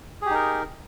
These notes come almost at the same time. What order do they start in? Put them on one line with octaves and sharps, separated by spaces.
G#4 G4 D#4 A#4